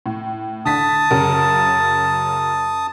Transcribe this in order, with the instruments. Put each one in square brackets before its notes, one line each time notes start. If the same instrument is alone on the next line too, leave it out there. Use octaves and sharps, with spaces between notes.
[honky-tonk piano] A2
[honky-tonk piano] D3 B6 [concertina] A5 D#6
[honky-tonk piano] F#2 C#3 A#4